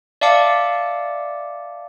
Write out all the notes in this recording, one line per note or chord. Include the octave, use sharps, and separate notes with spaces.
D5 E5 F5 A5 D6 C#7